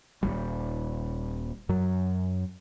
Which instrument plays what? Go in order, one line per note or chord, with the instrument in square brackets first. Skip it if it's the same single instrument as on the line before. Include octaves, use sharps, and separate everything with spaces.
[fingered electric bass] D#1 A#1 G3
F#2 F#3